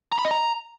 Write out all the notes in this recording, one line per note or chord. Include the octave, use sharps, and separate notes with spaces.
A#5
B5
D#5
A#5